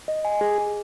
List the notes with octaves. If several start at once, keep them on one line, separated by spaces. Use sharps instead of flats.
D#5
G#5
G#4
G#4